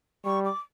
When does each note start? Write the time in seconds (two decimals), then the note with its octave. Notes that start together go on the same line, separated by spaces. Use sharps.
0.25 G3 C#6
0.45 D6